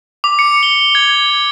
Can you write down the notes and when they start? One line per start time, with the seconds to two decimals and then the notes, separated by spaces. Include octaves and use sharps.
0.24 D6
0.39 C#7
0.63 G7
0.95 G#6